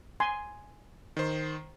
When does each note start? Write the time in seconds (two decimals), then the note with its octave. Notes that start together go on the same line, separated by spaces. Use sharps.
0.20 G#5 C6
1.17 D#3 C5